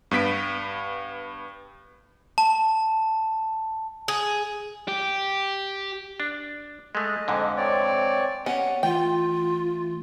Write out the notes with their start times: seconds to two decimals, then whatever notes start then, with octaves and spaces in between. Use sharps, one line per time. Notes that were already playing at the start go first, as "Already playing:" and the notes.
0.11 G2 B3 B6 D7
2.38 A5
4.08 G#4
4.88 G4
6.20 D4
6.95 G#3 A3 D#5
7.28 F2 G#2 D3
7.57 C4 C#5 D5
8.46 B3 C#4 G4 D#5 F#5
8.83 E3 A3 F4 G5